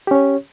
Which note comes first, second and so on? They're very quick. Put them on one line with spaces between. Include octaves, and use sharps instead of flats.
G4 C#4 C#5